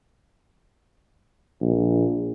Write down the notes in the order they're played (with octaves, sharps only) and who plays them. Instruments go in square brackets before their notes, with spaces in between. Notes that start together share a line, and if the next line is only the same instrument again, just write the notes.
[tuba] A#1